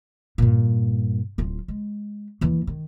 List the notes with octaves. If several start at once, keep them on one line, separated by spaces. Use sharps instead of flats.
G2 A#2
D1 F4
G#3
D#2 E3
D#3